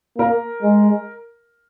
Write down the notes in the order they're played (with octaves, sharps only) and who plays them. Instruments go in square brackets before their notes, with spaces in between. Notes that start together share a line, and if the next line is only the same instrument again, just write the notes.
[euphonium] A#3 [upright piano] A#4
[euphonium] G#3